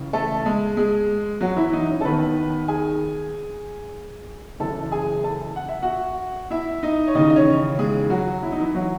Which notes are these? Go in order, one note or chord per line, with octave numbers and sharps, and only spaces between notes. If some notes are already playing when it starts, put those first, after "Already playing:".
Already playing: C#2 C#3 E3
A3 A4
G#3 G#4
G#3 G#4
F#3 F#4
E3 E4
D#4
C#4
A4
D#2 D#3 B3 B4
G#4 G#5
F#1 F#2 E3 A4 A5
G#4 G#5
A4 A5
F#5
E5
F#4 F#5
E4 E5
D#4 D#5
C#5
D#2 C#3 E3 D#4 D#5
D#5
C#4 C#5
G#3 G#4
F#3 F#4
E4
D#4
E3 E4
F#3 F#4